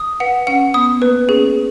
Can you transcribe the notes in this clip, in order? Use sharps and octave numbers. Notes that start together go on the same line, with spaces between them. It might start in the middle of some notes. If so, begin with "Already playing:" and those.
Already playing: D#6
B4 F#5
C#4 F#5
B3 D#6
A#3 B4
C#4 G#4